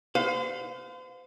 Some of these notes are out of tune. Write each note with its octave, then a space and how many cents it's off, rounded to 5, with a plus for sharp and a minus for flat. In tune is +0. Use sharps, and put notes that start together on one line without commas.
C5 -40 F5 +25